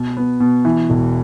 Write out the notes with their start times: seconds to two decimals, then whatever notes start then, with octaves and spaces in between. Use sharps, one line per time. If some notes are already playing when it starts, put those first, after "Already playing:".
Already playing: B2
0.17 B3
0.40 B2
0.65 E3
0.90 E1